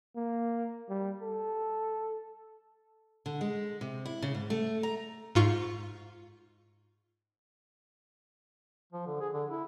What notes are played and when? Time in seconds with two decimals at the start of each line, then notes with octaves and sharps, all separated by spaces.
0.16 A#3
0.89 G3
1.22 A4
3.26 D3
3.41 G#3
3.81 C3
4.06 E4
4.22 C#3
4.34 G#2
4.50 A3
4.83 A#5
5.35 G#2 F4 C#6
8.93 F3
9.06 D3
9.21 G#4
9.34 D3
9.51 E4